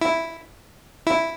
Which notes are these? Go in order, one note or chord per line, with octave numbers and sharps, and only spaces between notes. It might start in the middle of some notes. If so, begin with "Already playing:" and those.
E4
E4